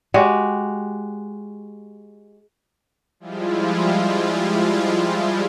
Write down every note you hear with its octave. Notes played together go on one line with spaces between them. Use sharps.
G#3 F#4 G4
F3 G3 G#3 E4 F4